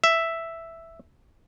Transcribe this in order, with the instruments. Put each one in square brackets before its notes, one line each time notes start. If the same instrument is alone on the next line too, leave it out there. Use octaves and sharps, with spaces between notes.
[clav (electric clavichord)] E5